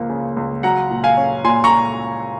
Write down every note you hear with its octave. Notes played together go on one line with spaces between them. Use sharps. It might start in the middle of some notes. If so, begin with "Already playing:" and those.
Already playing: C#2 F3 A#3
C#3
C#2
F#3 F#5 A#5
A#2
F5 G#5
C#4
A#2 G#5 C6
A#5 C#6